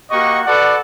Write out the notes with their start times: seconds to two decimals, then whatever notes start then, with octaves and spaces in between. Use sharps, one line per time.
0.11 A#3 F#4 G4 D#5 F#5 C#6
0.46 F#4 A4 B4 D5 F#5